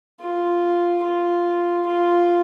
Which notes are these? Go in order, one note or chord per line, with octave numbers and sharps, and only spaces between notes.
F4
F4
F4